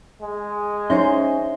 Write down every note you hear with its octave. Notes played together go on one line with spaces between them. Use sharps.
G#3
C#4 D#4 C5 E5 G#5 C6 A#6